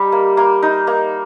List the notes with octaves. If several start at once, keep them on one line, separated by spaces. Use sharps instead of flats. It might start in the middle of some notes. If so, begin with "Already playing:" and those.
Already playing: G3 D#4
A#3
A#3
D#4
A#3